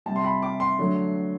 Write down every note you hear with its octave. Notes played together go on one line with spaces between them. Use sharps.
C3 G3 A5
C6
B5
D6
C6
D3 F#3 A3